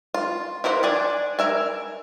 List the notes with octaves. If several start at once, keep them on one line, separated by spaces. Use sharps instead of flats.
F4
E4 A#4 C5 D#5 F#5
D4 D5 G#5
A#4 E5 G#5